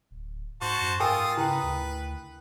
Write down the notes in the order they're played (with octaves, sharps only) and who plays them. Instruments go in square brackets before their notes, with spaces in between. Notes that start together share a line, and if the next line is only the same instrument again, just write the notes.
[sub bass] D1
[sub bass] G#2 [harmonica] F#4 C5 A5 [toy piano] C#6
[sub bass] F#2
[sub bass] G#2 [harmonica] F4 D#6 [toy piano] A#4 G5 G#5
[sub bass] C#3 [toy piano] E4 G5 [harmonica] B4
[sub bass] D2